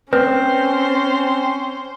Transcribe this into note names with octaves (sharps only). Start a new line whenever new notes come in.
C4 C#4 B4 C5